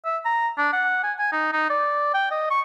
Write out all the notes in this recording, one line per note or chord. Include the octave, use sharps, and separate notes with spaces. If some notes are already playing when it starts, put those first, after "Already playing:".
E5
A#5
D4
F#5
G#5
G#5
D#4
D#4
D5
G5
D#5
C#6